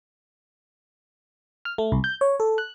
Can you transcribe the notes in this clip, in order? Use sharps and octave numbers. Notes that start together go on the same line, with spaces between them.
F6
A3
C2
G6
C#5
A4
F#6